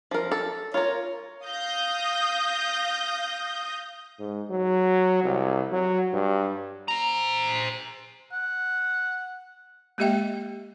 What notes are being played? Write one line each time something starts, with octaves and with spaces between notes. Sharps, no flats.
F3 A#4
A4
F4 A#4 C#5
F5 D#6 G6 A#6
G#2
F#3
C2
F#3
G2
C5 A#5
F#5
G#3 A#3 G4 D#5 E5 G5